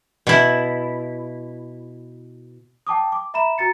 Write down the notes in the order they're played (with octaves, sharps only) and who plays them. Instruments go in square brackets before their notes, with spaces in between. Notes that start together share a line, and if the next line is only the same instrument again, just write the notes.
[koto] B2 E4
[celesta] G5 A5 D6 D#6
D6
E5 A#5 B5 E7
F#4 A#5 A6 C#7